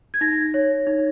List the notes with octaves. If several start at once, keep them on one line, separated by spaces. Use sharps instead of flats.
G#6
D#4 A#6
C#5
D#4